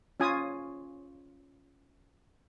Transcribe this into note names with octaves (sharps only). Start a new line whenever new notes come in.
C#4 F4 G#5 D#6